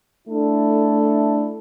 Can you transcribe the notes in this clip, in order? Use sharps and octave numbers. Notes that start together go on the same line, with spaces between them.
A3 D4 E4 A4